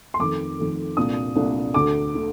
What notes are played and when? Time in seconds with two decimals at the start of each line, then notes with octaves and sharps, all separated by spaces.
0.14 C6
0.20 F2 D#3 A3 D6
0.58 F2 D#3 A3
0.97 C2 A#2 A3 D4 D#6
1.35 C2 A#2 A3 D4
1.74 D2 D3 A3 D6
2.15 D3 A3